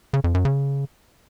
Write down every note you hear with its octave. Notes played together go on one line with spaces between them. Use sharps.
C#3
F2
F#2
C#3